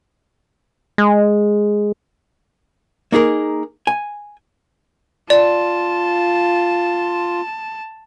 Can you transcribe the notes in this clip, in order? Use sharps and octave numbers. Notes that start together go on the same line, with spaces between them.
G#3
A#3 D#4 G#4 A#4
G#5
F4 D5 A5